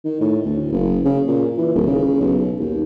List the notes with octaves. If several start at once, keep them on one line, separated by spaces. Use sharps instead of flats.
D#3
A2
D2
F#1
C#3
A#2
E3
D#1
C#3
B1
D#2